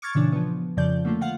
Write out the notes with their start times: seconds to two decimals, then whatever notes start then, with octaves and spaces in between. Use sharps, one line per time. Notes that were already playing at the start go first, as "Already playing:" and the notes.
0.02 C#6 D6 F6 G#6 A6
0.15 A#2 C#3 E3 D4
0.32 F3 B3
0.77 F2 C#3 F3 D5 G6
1.05 D3 A3 A#3 F4
1.21 F4 F5 F#5